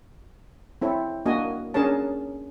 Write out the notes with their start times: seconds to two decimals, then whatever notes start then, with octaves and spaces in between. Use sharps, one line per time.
0.82 C4 E4 A4 C#5
1.26 A#3 D4 F#4 D#5 G#5
1.74 C#4 D4 G#4 A#4 C#5 A5